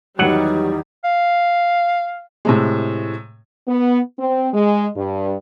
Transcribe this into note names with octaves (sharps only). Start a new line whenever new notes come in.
E2 D#3 E3 F#3 G3 D#4 F#5
F5
A2 C3 G#3
B3
C4
G#3
G2